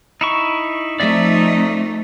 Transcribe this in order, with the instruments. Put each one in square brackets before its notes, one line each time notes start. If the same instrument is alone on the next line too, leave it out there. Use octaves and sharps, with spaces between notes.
[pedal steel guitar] D#4 E4 C#6
[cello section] F3 C4 D#4 [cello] A3 [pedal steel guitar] D5 E5